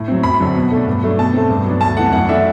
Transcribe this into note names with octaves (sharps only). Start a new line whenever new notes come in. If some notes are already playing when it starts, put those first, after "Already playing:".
Already playing: A2
F#3 C4
F#2 B5
D3 F#3 C4
B2
A3 D4
G2
F#3 A3 D4
B2 A5
A3 C4
G2
F#3 B3 D4
D2 A5
C3 E3 A3 F#5
F#2 F#5
E3 A3 D4 E5